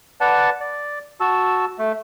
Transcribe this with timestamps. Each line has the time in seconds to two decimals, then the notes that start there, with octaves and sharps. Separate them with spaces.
0.21 B4 D5 F#5 A5
0.60 D5
1.20 F#4 A5 E6
1.78 A3